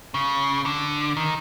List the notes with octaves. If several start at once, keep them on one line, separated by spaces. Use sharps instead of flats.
C#3
D3
D#3